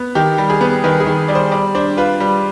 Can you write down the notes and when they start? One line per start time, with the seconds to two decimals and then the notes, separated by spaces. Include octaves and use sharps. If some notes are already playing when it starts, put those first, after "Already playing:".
Already playing: B3
0.15 D#3 G4
0.38 G3
0.50 G#4
0.61 B3
0.84 D#3 B4
1.00 G#4
1.06 D#3
1.28 G3 D5
1.35 C5
1.52 G3 D5
1.75 D4 C5
1.97 F4 B4
2.20 G3